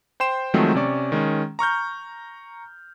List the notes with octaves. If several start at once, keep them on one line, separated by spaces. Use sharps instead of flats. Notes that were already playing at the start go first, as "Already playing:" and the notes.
C5 G5 C6 E7
D#3 F3 F#3 G#3 A3 C4
C3 C#4 D5 C#6
D#3 G#3 C#4
A#5 C#6 F6 G6